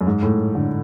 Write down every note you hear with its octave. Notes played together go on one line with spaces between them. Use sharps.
F#2
G#2
A2
D3